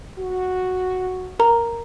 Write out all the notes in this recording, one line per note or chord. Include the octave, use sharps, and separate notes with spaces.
F#4
A#4 A#5